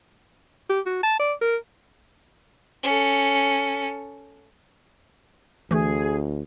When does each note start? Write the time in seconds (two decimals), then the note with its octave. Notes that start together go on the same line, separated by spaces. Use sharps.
0.69 G4
0.86 F#4
1.03 A5
1.19 D5
1.41 A#4
2.83 C#4 A4
5.71 D2 E3 A3 G#4